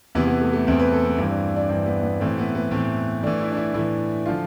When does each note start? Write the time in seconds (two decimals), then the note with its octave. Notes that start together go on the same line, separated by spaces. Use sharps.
0.15 E2 C3 E3 B3
0.27 B3
0.41 A3
0.53 A3
0.67 E2 C3 E3 C4
0.79 B4
0.92 A4
1.05 B3
1.18 G2 E3 C4
1.30 D4
1.56 D4
1.69 G2 E3 C4
1.86 B3
2.03 B3
2.20 A2 E3 C4
2.38 B3
2.55 B3
2.71 A2 E3 C4
3.23 A2 E3 D4
3.41 E4
3.52 D4
3.57 E4
3.74 A2 E3 E4
4.26 D3 F3 F4